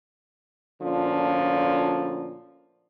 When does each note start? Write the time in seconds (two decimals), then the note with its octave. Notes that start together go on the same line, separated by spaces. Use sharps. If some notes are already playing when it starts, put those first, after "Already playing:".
0.82 D2 A#2 D3 F3 C#4